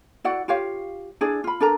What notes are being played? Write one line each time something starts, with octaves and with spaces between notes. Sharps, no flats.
E4 F#4 D5 F#5
F4 G4 C#5 F5
D4 E4 G#4 D5
F4 B5
D4 A4 A#4 A#5